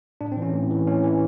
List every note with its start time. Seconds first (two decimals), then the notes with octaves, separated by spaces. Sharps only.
0.21 A2 D4
0.32 C4
0.37 E3 C#4
0.54 A2
0.71 E3
0.87 A2 C#4
1.04 E3